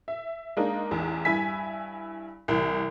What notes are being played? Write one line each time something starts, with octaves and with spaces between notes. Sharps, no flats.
E5
G#3 A#3 D4 D#4 A#4
A1 E2
G2 E4 G#5 B6
C2 E3